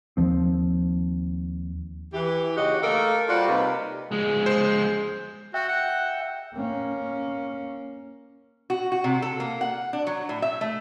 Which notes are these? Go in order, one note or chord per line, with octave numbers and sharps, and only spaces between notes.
D#2 F3 C4
E3 G4
D#2 C#3 F#4 G4 D#5
A3 A#3 A4 A#4
G3 F4 F#4 C5 D5
C3 G3 A#3 D#4 B4
F3 G#3 G#4
C5
F#4 E5 G5
F#5
A#3 C#4
F#4
F#4
C3
A4
A#3
F#5
D4
F#3
A2
E5
A3